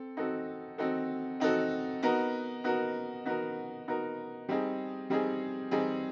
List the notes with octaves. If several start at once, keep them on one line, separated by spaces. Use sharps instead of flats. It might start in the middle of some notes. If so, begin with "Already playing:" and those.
Already playing: C4 A4
C4 D#4 F#4 A4
C4 D#4 F#4 A4
C4 D#4 F#4 A4
B3 D#4 F#4 A#4
B3 D#4 F#4 A#4
B3 D#4 F#4 A#4
B3 D#4 F#4 A#4
G3 C4 D#4 G#4
G3 C4 D#4 G#4
G3 C4 D#4 G#4